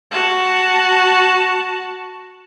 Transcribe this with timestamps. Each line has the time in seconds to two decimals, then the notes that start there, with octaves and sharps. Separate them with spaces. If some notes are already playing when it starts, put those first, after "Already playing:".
0.11 F#4 A5